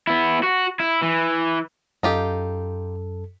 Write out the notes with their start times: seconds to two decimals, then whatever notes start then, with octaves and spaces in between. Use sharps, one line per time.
0.07 B3 E4
0.43 F#4
0.80 E4
1.03 E3
2.03 F#2 D#4 F4 G4 A4